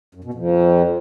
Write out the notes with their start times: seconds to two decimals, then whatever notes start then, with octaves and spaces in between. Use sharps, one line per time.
0.15 F#2
0.24 B2
0.34 F2